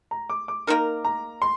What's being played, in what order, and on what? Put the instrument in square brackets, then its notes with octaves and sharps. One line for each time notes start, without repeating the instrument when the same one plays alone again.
[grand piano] A#5
D6
D6
[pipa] A#3 D#4 A#4
[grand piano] A#5
C6